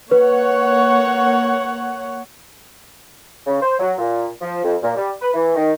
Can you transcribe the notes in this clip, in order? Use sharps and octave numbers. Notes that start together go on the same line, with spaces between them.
A#3 B4 C#5 F#5
C#3
C5
F#3
A#2
F3
F2
A#2
G3
B4
E3
D#3